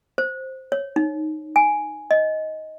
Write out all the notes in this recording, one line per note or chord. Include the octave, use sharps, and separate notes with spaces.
C5
C#5
D#4
G#5
D#5